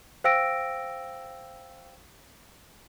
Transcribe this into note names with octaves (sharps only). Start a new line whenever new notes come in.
C5 F5 G5 E6 A#6 D7